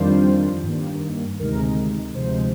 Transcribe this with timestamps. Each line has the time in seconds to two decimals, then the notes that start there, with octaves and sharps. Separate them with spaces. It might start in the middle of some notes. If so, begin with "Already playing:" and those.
Already playing: F2 D#3 G3 D4 F4 C5
0.63 G2 D#3 A#3
1.39 D2 C3 D#3 G#3 D#4 A#4
2.15 D2 C3 F3 G#3 C5